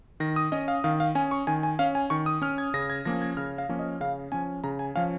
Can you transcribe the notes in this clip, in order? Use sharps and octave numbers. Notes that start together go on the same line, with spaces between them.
D#3 A#6
D#6
C#4 D#5
F5
D#3 F5
F5
C#4 G#5
C#6
D#3 G#5
G#5
C#4 F5
G#5
D#3 C#6
D#6
C#4 F6
G#6
C#3 A#6
G#6
F3 A#3 C#4 A#6
G#6
C#3 F6
F5
F3 A#3 C#4
D#5
C#3 F5
F3 C#4 G#5
C#3 A#5
G#5
F3 C#4 F5